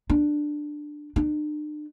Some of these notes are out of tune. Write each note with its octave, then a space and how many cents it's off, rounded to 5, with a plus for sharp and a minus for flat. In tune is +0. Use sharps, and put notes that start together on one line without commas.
D4 +10
D4 +45